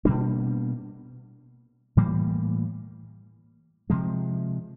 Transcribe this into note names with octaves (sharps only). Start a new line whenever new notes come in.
B2 G3 A#3 D4
A2 E3 G3 A#3
C3 F3 G#3